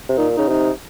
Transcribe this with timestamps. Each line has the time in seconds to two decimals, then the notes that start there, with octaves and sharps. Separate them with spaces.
0.09 C3
0.17 A#2 D#4
0.37 C#3 D#4
0.48 C3 D#4